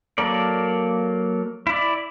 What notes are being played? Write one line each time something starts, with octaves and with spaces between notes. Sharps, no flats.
F#3 A#3 A4 A#4 D5
E4 D5